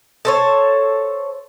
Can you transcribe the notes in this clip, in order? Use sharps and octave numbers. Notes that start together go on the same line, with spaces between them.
A4 C5 C#5